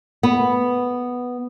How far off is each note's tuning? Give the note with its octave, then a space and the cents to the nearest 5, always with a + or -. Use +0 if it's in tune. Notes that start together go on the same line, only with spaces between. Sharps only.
B3 +0